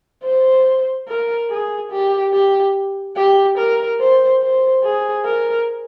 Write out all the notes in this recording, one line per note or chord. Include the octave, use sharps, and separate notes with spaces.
C5
A#4
G#4
G4
G4
G4
A#4
C5
C5
G#4
A#4